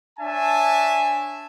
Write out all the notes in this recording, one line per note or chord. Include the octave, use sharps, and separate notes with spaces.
D4 C#5 E5 G#5 A5